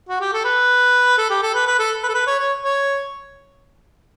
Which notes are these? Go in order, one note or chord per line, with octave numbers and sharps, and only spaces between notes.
F#4
G4
A4
B4
A4
G4
A4
B4
B4
A4
B4
A4
B4
C#5
C#5
C#5